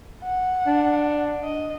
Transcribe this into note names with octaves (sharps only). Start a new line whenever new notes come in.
F#5
D4
D#5